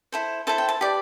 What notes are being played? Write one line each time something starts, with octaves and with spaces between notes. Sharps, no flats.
E4 A4 C5
E4 A4 C5 A5
G5
A5
G4 B4 D5